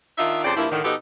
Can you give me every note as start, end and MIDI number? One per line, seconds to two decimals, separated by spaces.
0.18 0.44 51
0.18 0.44 62
0.18 0.44 63
0.18 0.44 65
0.18 0.44 76
0.44 0.52 41
0.44 0.52 49
0.44 0.52 67
0.44 0.52 72
0.44 0.52 74
0.56 0.66 43
0.56 0.66 53
0.56 0.66 55
0.56 0.66 58
0.56 0.66 64
0.71 0.82 45
0.71 0.82 50
0.71 0.82 51
0.84 0.94 47
0.84 0.94 53
0.84 0.94 59
0.84 0.94 63
0.84 0.94 67
0.84 0.94 69